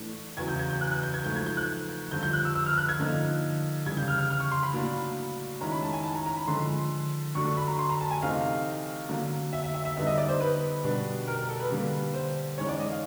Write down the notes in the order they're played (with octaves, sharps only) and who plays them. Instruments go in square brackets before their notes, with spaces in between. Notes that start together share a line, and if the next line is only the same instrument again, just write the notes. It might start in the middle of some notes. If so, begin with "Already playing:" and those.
Already playing: [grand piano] A2 E3 A3 D4
[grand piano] E2 C#3 F#3 [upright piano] G#6
[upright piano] G6
G#6
G6
F#6
F#6
G6
G#6
[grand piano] G#2 F3 A3 [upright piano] G6
[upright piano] G#6
G6
F#6
[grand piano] G2 D3 F3 [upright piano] G6
[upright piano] G6
F#6
E6
E6
F6
F#6
G#6
[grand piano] D3 F3 A#3 D#4
[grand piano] C#3 E3 G3 [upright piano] G#6
[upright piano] G6
F6
F6
F6
C#6
C6
B5
[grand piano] A2 F#3 A#3 D4
[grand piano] D#3 G#3 C#4 E4 [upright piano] A#5
[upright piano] B5
A5
G#5
A5
A#5
A#5
B5
[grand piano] D3 F3 G#3 [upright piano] C6
[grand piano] D3 F#3 A3 D4 [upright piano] C#6
[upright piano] C#6
B5
A#5
C6
A#5
A5
G#5
[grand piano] C3 E3 A3 C4 D#4 [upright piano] F5
[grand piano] D3 F#3 A#3
[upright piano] E5
E5
E5
E5
[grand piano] D3 G3 B3 D#4 [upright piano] E5
[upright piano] D#5
D5
C5
B4
[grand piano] B2 G3 B3 D4
[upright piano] A#4
A#4
A4
B4
[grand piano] D3 G3 A#3 D4
[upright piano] C5
[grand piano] G#2 E3 G#3 C#4 [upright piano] C#5
[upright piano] D5
D#5
F5